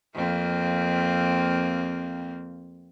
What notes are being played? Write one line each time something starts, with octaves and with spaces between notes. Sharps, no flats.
F2 A#3 C4